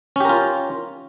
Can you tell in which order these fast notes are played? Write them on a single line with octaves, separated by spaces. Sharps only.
C#4 G4 A#4 F4